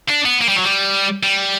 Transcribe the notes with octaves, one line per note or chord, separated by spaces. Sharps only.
D4
B3
A#3
G3
F#3
G3
G3